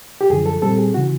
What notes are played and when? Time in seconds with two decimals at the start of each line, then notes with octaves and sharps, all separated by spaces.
0.21 G4
0.30 F#2 D3 F3 G#4
0.46 A4
0.62 A#2 G3 C4 A4
0.78 G#4
0.94 C#3 E3 F#4